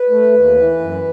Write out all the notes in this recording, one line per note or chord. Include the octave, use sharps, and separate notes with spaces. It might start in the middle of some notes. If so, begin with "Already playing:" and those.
Already playing: B4
A3
D#2
E3
F#2